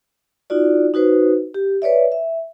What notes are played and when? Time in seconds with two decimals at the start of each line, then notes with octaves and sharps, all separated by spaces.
0.50 D#4 F4 F#4 D5
0.94 D#4 F#4 B4 C5
1.54 G4
1.82 B4 C#5 D5 E5
2.12 E5